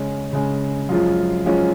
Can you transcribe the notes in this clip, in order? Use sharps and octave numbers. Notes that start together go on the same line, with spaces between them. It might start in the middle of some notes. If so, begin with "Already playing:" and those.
Already playing: C#3 G#3 C#4
C#3 G#3 C#4
F#2 F3 G#3 C#4 F4
F#2 F3 G#3 C#4 F4